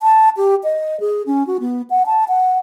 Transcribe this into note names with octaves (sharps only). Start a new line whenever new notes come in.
A5
G4
D#5
G#4
C#4
F#4
B3
F#5
A5
F#5